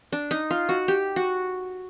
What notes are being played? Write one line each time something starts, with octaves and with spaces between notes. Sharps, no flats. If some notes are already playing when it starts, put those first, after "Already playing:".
D4
D#4
F4
F#4
G4
F#4